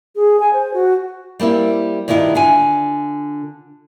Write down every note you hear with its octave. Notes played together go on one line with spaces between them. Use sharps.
G#4
G#5
C5
F#4
G3 A#3 C4 E4
G2 D#3 G3 E4 F4
D3 F4 G#5